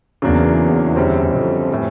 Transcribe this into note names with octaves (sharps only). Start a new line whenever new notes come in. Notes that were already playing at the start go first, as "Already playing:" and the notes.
E2 C#3 F#3 A#3 D4
F#2 D3 G3 C4
F2
A2 E3 G3